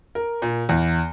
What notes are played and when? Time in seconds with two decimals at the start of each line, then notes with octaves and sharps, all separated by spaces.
0.15 A#4
0.42 A#2
0.69 E2